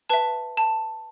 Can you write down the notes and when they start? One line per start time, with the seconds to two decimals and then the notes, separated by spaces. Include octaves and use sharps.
0.10 B4 E5 A5
0.57 A5